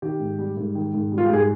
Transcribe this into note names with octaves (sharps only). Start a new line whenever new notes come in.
D#3 G4
G#2
G3
G#2
D#3
G#2
G3
F4
G4
G#2 G#4